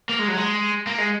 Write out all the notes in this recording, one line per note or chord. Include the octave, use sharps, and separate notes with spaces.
A#3
G#3
F#3
G#3
A#3
G#3